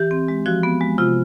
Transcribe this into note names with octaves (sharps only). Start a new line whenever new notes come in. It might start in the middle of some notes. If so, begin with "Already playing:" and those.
Already playing: E3 G4
C4
G#3
F3 F#4
B3
G#3
C3 F4